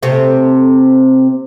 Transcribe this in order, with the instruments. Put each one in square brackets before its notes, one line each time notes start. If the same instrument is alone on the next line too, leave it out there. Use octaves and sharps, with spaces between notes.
[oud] C3 A3